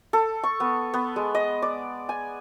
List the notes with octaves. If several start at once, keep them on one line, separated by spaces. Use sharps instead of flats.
A4
C#6
B3
B3
G#3
D#5
D5
G#5